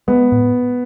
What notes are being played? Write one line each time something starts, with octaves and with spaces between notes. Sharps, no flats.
G#3 B3
A2